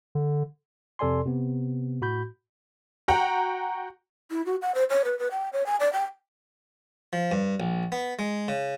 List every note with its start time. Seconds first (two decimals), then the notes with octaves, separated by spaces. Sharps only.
0.15 D3
0.99 F2 C3 A4 D5 G#5 C6
1.25 C3 B3
2.01 A2 F#4 B5 G6
3.08 F#4 F#5 G5 A#5
4.30 E4
4.46 F#4
4.62 F#5
4.75 C5
4.90 C#5
5.05 B4
5.19 B4
5.31 G5
5.53 C#5
5.66 G#5
5.80 D5
5.93 G5
7.13 F3
7.32 G2
7.60 A#1
7.92 B3
8.19 G#3
8.48 C#3